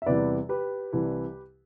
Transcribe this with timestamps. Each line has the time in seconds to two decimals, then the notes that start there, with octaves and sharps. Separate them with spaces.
0.02 E5
0.06 E2 C3 E3 G3 B4 D5
0.49 G4 B4
0.93 C2 C3 E3 G3